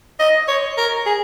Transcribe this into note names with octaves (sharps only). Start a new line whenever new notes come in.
D#5
C#5
A#4
G#4